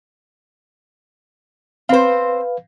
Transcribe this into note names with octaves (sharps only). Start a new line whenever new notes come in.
C4 B4 C5 F5